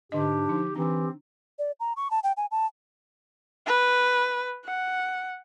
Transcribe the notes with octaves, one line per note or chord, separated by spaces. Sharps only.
G#2 D3 D4 G4 D#5
F3 D#4
E3 C4 D4 G4
D5
A#5
C#6
A5
G5
G#5
A5
B4
F#5